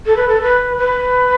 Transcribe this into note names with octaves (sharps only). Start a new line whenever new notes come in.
A4
B4
A4
B4
B4